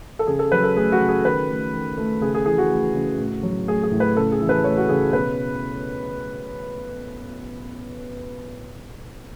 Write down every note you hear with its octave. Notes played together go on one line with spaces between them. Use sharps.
A4
C#3 G#4
A4
F#3 B4
A4
A3 G#4
F#4
C#3
G#4
D#3 B4
A3
D#3
A3
C#3 G#4
G#4
E3 G#4
F#4
A3
C#3
A2
F#3
A3 G#4
G#4
A2
B4
C#3 A4
G#4
E3
B4
A3 C#5
F#4
C#3 G#4
B2 B4